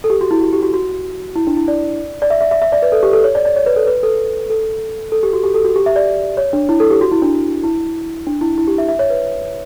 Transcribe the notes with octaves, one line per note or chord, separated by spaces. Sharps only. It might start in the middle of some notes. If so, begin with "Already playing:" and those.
A4
G4
F#4
E4
F#4
G4
F#4
F#4
E4
D4
E4
D5
D5
E5
E5
E5
E5
D5
B4
A4
G4
A4
C#5
D5
D5
C#5
B4
A4
B4
A4
A4
A4
G4
F#4
G4
A4
F#4
G4
E5
D5
C#5
D4
E4
A4
G4
F#4
E4
D4
E4
D4
E4
E4
G4
E5
E5
C#5
B4